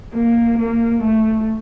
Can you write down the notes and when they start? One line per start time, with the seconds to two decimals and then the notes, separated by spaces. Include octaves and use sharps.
0.14 A#3
0.59 A#3
1.04 A3